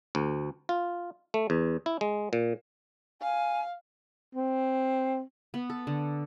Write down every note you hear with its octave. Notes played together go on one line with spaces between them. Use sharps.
D2
F4
A3
E2
E4
G#3
A#2
F5 G#5
C4
B3
A4
D3